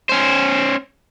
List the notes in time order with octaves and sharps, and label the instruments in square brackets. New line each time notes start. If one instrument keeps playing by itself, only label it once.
[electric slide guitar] C#4 C5